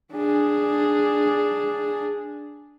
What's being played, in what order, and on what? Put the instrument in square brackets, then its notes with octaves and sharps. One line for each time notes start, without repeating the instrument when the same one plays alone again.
[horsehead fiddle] D4 G#4